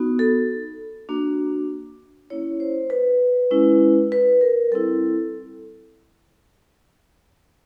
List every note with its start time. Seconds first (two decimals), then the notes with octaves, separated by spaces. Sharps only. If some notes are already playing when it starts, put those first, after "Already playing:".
Already playing: B3 D#4 F#4
0.19 A4
1.09 A#3 D4 F#4
2.30 A#3 C#4 E4 C#5
2.60 C5
2.90 B4
3.51 G#3 C#4 E4
4.12 B4
4.41 A#4
4.71 G3 C4 E4 A4